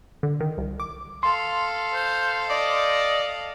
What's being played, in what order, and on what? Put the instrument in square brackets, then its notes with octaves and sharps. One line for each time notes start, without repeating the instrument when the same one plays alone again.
[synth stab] D3
D#3
C2
D6
[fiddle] A4 F5 [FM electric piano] C6
[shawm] C5
[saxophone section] D5 [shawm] D#5